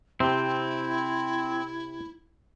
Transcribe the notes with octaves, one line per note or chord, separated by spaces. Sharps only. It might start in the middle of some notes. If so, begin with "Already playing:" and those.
C3 C4 E4 G4